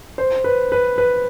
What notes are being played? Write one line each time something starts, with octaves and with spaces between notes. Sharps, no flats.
C5
B4
B4
B4